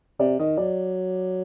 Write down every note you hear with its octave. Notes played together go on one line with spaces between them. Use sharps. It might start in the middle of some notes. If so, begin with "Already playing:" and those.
C3 D5
D#3 D#5
F#3 D5